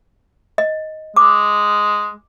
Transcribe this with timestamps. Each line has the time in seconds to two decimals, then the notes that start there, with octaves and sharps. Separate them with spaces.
0.58 D#5
1.17 G#3 D6